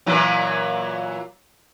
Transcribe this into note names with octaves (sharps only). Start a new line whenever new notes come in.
A#2 E3 F#3